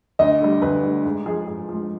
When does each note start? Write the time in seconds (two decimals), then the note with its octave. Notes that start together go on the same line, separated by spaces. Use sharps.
0.19 D2 D#5
0.41 D3 G3
0.62 D2 B4
0.83 D3 G3
1.04 G#2
1.26 F3 G#3 G#4
1.47 G#2 G#4
1.69 F3 G#3